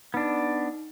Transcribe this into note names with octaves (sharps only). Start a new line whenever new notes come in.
B3 D4 D#4